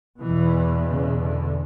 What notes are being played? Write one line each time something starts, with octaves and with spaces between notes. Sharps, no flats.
E2 B2 E3
C#3
D3